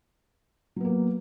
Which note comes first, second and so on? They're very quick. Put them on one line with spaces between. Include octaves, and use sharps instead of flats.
F#3 B3 A#3